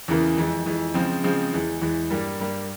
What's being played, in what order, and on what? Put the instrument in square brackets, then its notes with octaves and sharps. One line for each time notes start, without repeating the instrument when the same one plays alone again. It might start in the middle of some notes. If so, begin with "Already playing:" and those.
[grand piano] E2 C#3 E3 A#3
F2 E3 G#3
F2 E3 G#3
C#3 F3 G#3 C4
C#3 F3 G#3 C4
E2 E3 G#3
E2 E3 G#3
G2 G3 A#3
G2 G3 A#3